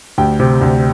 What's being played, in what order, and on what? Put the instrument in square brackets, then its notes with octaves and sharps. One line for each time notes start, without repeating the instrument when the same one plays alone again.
[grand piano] D2 G4 G5
C3
D2